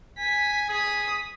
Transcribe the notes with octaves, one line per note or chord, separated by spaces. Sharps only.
G#5 B6
G#4 D#6 B6